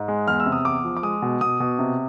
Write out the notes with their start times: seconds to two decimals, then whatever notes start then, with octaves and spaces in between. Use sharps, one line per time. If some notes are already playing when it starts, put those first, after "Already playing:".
Already playing: G#2
0.08 G#3
0.27 E2 F6
0.40 E6
0.46 C3
0.52 D#6
0.65 E2 D6
0.85 F3
0.97 D6
1.03 G#3 D#6
1.22 B2
1.41 B2 D#6
1.60 B2
1.79 C3